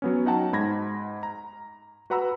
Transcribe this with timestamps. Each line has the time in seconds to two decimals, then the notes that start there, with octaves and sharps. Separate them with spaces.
0.02 F#3 B3 C#4
0.26 D#4 F#4 F#5 G5 A5 A#5
0.53 G#2 B5 G#6 A#6
1.23 A#5
2.10 F#4 B4 F#5 A#5 B5 E6